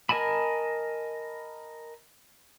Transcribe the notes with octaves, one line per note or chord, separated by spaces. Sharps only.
A#4 D#5 G#5 A5 B5